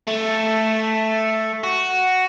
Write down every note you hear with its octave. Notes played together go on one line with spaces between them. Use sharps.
A3
F#4